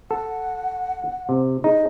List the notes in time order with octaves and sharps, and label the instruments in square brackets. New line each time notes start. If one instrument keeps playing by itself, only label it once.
[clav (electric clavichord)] A4 [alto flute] F#5
[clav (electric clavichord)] C3
[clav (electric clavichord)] D#4 [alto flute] G#4